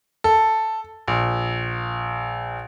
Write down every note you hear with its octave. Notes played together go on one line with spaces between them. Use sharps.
A4
A#1